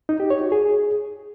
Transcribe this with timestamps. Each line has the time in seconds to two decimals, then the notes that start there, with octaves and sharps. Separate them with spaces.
0.09 D#4
0.20 G4
0.30 C#5
0.41 F#4
0.52 G#4